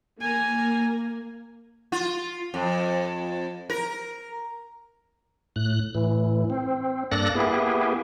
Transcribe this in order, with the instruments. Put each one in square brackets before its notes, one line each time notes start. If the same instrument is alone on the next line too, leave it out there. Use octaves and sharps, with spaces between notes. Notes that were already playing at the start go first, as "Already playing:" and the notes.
[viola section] A#3 [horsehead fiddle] G#5 A#5
[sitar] F4
F2
A#4
[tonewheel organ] A2 F#6
A2 E3
C4
G2 A#3 A4 D5 F#6 A#6
A#3 B3 E4 G4 G#4